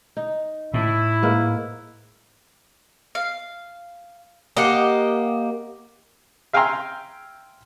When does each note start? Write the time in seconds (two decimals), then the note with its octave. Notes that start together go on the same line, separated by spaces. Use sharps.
0.17 D#4
0.74 A2 E4
1.22 G#2 A#3 B4
3.15 F5
4.57 A#3 G4 D#5 F#5
6.53 E5 F5 G5 G#5 A#5 C6